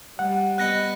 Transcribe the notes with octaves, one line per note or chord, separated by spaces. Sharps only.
G3 F#5
B3 B4 D#5 F#6 A#6 C#7